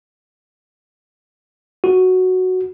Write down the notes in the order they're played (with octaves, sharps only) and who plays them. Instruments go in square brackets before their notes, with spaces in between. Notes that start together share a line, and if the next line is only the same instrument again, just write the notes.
[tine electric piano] F#4